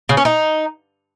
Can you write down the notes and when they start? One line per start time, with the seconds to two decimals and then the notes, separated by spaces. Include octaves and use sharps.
0.09 C#3
0.17 C#4
0.25 D#4